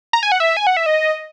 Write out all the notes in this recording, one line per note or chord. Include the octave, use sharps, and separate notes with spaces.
A#5
G#5
F#5
E5
G#5
F#5
E5
D#5